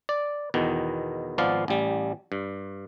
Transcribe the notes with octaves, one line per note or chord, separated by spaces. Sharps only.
D5
E2 B2 D#3
G#1 F3 B3 D5 F5
A1 G3
G2